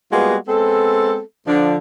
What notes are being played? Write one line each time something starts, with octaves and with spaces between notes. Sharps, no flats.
G3 G#3 A#3 B3 F4 F#4
G#3 B3 C4 A4
D3 F3 D4